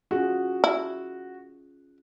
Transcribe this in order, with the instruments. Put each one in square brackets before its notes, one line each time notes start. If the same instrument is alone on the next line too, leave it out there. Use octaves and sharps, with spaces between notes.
[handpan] C#4 F4 G#4 [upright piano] F#4
[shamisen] E4